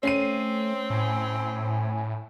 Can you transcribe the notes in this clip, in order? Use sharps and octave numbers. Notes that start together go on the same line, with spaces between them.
A3 C4 C#4 C7 D#7
A2 G#5